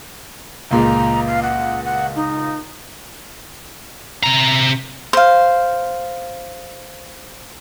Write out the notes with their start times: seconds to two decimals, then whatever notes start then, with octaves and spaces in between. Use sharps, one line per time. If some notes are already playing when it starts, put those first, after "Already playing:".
0.71 C#2 A#2 G#3 A#5
1.27 F5
1.43 F#5
1.84 F#5
2.16 D#4
4.23 C3 A#5
5.13 C5 F5